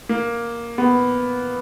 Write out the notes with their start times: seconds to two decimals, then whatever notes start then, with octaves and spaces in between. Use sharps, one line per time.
0.09 A#3
0.78 B3